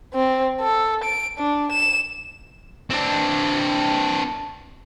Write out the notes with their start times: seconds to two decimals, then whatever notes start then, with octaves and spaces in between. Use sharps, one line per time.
0.14 C4
0.61 A4
1.04 D7
1.39 D4
1.72 E7
2.90 C4 D4